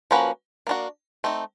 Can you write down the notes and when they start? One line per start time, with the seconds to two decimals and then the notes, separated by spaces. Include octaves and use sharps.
0.11 F3 A#3 C#4 F#4 B4
0.67 A#3 D4 F#4
1.24 A3 C4 D#4